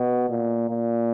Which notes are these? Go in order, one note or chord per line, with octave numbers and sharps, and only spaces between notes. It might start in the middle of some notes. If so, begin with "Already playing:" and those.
Already playing: B2
A#2
A#2